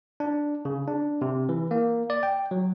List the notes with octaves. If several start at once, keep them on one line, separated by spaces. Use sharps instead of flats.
D4
C#3
D4
C3
E3
A#3
D5
G5
F#3